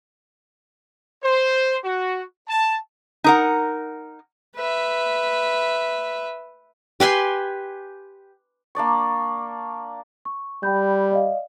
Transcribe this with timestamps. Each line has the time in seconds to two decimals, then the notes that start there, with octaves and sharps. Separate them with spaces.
1.23 C5
1.85 F#4
2.49 A5
3.24 D#4 A#4 F#5
4.56 B4 E5
7.00 G4 B4 G#5 C6
8.75 A#3 D4 D5 C#6
10.25 C#6
10.63 G3 G5 B5 G6
11.11 D5 D#5 F5